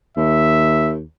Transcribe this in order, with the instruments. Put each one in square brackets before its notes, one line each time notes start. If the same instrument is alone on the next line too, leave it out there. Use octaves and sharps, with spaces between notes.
[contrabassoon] D#2 [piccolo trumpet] E5